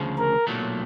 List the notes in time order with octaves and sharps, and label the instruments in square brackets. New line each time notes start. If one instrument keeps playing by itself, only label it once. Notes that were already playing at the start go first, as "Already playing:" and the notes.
Already playing: [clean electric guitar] D2 C#3 F3
[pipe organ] A#4
[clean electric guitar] B1 A#2 F#3 A3